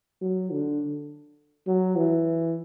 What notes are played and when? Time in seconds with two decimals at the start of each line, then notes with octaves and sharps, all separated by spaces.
0.21 F#3
0.51 D3
1.67 F#3
1.96 E3